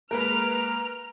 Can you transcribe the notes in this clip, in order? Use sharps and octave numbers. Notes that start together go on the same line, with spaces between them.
G#3 A#3 A#4 B4 A#5 F6